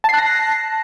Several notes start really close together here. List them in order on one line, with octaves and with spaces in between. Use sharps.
A5 C7 F#6 A#6